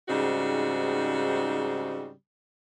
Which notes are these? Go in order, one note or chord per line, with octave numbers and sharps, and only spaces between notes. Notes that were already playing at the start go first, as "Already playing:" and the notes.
G#2 C#3 G3 C4 D#4 F#4